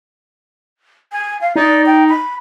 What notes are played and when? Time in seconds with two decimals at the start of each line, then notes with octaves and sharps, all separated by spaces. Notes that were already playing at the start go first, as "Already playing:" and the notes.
1.12 G#5
1.41 F5
1.56 D#4 D5
1.86 G5
2.09 B5